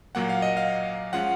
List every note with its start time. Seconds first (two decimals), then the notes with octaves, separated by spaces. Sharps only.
0.15 A#2 F#3 A#3 F#5
0.29 F5
0.42 D#5
0.57 F5
1.13 F3 G#3 C#4 F4 F#5